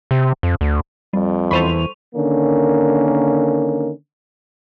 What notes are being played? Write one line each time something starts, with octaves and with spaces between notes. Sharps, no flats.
C3
F2
D2
F2 G3
E2 A4 C5 B5 C#6 D#7 F7
D3 D#3 A#3 C#4